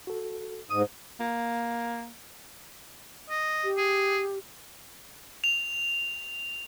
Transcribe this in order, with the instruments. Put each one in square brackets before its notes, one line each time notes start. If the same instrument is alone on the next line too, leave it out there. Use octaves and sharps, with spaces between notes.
[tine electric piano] F#4 A4
[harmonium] G#2 [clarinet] D#6
[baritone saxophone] A#3
[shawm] D#5
[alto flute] G4
[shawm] G#4
[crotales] F7